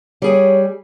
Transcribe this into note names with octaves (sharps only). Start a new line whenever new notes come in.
G3 G#4 C#5 G#5